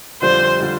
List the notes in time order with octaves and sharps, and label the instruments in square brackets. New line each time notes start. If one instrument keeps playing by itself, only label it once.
[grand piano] F2 D3 G3 F4 D5 [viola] C5
[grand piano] D3 G3 F4 D5